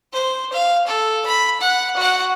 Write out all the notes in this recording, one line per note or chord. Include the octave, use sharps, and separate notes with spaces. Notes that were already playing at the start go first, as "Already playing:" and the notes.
C5
F5
A4
B5
F#5
F#4 F#5